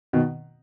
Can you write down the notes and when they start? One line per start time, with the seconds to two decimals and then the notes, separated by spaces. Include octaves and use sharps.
0.13 B2 D#3